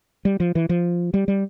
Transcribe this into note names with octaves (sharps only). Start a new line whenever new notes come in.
G3
F3
E3
F3
G3
G3